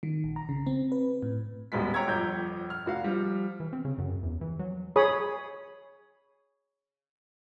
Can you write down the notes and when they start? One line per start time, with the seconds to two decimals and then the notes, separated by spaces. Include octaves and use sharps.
0.03 D#3
0.24 A#1
0.36 A#5
0.49 C#3
0.67 C4
0.92 B4
1.22 A2
1.72 D#1 B2 G#3 B6
1.94 C#5 G5 A#5 C#6 E6 G#6
2.07 G1 F2 G6
2.70 F6
2.86 F1 F#4 F5
3.04 F3 G3
3.60 E3
3.73 C4
3.85 C#3
3.98 F#2
4.23 E2
4.41 E3
4.59 F#3
4.96 G#4 C#5 B5 D#6